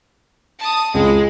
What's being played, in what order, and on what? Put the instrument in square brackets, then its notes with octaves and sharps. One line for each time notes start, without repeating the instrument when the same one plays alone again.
[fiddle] A5 D#6
[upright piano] C#2 [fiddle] G#3